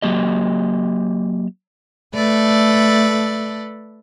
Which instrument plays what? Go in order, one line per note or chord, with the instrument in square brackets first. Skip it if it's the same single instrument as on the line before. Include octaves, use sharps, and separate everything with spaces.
[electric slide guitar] F#3 A#3 G4 D#5
[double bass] A3 [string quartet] A4 B4 D5